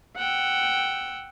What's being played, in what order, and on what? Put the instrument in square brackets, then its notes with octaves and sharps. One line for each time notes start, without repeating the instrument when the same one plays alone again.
[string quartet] F#5 G5 E6